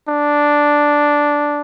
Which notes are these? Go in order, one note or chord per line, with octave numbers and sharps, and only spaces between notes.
D4